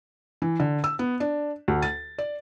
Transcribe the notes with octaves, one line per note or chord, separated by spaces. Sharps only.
E3
D3
E6
B3
D4
D2
A6
D5